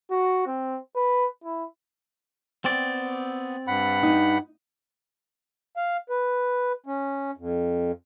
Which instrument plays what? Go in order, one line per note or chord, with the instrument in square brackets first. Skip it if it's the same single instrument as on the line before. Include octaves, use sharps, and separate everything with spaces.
[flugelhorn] F#4
C4
B4
E4
[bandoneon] B3 [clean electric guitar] C4 D5
[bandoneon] G2 F#5 B5
[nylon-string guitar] D#4
[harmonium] F5
B4
C#4
F2